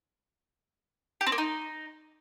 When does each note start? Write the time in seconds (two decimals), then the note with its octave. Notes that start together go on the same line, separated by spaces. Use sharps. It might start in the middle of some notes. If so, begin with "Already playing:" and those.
1.21 G4
1.26 C4
1.32 A#3
1.38 D#4